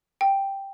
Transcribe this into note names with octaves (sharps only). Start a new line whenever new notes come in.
G5